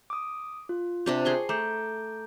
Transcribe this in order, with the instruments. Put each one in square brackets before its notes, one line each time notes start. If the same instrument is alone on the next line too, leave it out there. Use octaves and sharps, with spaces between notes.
[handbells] D6 D#6
F4
[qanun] C3 D4 G4
G#4 C6 C#6
[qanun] A3 [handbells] A#5 D6 G6